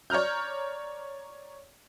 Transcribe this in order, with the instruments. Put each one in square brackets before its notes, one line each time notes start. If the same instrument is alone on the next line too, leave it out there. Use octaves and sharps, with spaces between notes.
[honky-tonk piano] C#5 D5 A#5 F6 G6